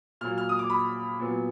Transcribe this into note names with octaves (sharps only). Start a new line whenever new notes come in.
A#2 F#3 A#3 F6
F6
D#6
D6
B5
A#2 F#3 B3